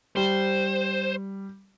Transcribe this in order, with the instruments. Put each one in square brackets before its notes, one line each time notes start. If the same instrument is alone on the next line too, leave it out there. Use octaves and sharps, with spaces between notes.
[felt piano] G3 [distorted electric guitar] C5